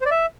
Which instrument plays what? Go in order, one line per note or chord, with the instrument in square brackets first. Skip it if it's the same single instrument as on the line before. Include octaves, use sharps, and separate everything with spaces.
[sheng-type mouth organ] C5
D5
E5